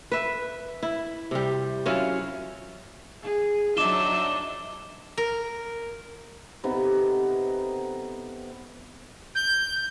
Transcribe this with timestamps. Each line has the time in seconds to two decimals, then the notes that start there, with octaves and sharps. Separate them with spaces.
0.12 B4 E5
0.83 E4
1.31 C3 G3
1.86 F#3 C#4 E4 F4
3.23 G#4
3.77 F#3 D4 D#4 E5 D6 E7 G7
5.18 A#4
6.64 C3 B3 D#4 A4
9.35 G6